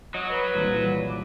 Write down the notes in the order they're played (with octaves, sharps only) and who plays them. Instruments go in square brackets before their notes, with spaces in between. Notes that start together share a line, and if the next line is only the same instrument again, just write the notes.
[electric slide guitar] F#3 [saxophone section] D#5
[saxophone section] B4
[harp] D#1 C2 E3
[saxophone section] D5